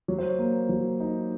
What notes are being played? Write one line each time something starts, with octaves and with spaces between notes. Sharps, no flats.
F#3 C#5
C5
C#5
A#3
F#3
D#4